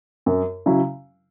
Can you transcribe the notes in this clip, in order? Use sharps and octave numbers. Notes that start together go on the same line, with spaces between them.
F#2
C#3 F#3 E4